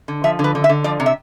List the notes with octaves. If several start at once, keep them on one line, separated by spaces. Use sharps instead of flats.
D3
F3 E5
D3
B4
D3
E5
D3
F3 D5
C3
E5